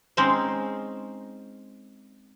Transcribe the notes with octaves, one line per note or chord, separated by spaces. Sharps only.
G#3 C4 C#4 D#4 C5